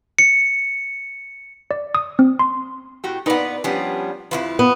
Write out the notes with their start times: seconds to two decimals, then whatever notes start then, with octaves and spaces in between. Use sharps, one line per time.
0.19 C#7
1.71 D5
1.95 D#6
2.19 C4
2.39 C6
3.04 A2 F#4 G4
3.26 A#2 B3 D#4 B4 D5
3.64 F3 G3 B3 C#4 D4
4.31 F2 F3 E4 F4 B4
4.59 B3